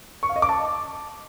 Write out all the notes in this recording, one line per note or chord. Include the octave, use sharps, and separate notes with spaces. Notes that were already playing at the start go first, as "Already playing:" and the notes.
C#6
F5
D#5
D6
A5